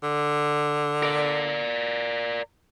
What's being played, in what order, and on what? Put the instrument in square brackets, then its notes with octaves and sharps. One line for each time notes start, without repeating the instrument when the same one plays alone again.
[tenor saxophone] D3
[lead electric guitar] A#4 D5